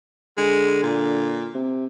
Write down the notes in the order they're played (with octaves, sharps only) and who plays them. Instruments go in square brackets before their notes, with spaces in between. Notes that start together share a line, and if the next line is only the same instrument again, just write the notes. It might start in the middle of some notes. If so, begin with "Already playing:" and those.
[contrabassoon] D3 [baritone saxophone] G#3
[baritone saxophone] A#2
[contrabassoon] C3